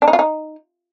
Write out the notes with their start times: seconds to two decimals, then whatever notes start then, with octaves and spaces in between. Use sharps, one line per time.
0.02 D4
0.08 D#4
0.13 F4
0.19 D#4